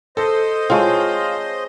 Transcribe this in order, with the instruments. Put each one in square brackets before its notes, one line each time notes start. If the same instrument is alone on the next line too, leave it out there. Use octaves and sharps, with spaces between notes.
[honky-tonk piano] A4 [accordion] C5 D#5
[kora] G#3 C4 [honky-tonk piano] F4 [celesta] C#5 A5 C#6